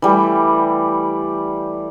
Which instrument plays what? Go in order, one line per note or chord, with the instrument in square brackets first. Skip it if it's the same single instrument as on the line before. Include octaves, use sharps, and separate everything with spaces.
[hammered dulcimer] E3 G3 A3